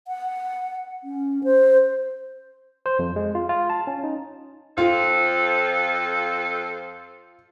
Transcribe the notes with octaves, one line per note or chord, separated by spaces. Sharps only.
F#5
C#4
C5
C5
F2
G#3
F4
F4
A5
C#4
D#4
F2 F4 A4 C5